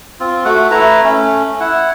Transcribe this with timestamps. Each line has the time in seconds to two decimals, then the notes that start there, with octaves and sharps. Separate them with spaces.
0.20 C4 F4
0.45 A3 F#4 F#5
0.71 A3 E4 B4 A#5
1.04 A3 C#4
1.60 E4 F#5